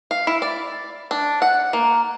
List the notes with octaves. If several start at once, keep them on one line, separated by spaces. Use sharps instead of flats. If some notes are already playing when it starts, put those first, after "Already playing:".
F5
E4
D5
D4
F#5
A#3